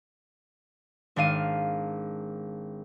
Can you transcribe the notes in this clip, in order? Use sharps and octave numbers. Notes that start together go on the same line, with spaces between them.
G#1 D4 F5 D#7